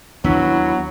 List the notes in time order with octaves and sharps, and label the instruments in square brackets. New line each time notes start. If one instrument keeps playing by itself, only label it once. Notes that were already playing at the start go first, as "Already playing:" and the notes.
[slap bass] D#2 B3 [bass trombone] F#3 [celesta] D4 E6 B6 [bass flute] E4